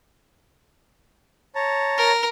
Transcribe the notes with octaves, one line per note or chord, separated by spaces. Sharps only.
C#5 A5 A#5
A#4